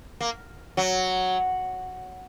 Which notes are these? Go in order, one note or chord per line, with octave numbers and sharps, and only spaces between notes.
A#3
F#3